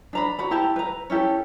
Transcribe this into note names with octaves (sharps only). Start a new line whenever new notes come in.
D4 A#5 B5
F#4 A#5 B5
E4 G4 A5 A#5
B4 A#5
C#4 E4 G4 A4